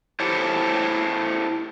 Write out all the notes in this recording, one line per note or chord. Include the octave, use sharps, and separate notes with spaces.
E4 G4 A4 C5 C#5